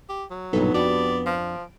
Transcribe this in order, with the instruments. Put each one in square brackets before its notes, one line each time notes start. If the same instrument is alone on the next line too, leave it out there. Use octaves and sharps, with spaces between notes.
[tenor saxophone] G4
F#3
[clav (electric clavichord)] B1 G2 A#2 [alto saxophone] B3 [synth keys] D#4 A4
[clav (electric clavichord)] F2 D4 G5 [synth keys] F#4 G4 B5 [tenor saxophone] D5
[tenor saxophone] F3 [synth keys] D7